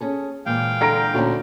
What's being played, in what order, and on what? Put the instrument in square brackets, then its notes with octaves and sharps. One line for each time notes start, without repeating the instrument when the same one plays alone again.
[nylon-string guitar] C#4 G#4 A4
[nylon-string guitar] A#2 E3 G#3 [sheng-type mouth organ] F5 G5
[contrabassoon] D3 [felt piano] A#5 A#6 D7
[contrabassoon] D2 [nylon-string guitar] A#2 C#4 E4